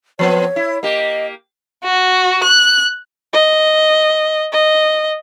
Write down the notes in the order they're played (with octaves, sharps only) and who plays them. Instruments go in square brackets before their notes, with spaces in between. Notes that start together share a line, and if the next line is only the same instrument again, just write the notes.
[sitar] F3 B3 C4 [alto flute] C#5
[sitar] E4
[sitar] A#3 G4 [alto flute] D#5
[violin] F#4
F#6
[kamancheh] D#5
D#5